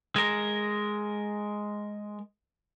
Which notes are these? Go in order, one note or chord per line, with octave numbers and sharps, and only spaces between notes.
G#3 A#4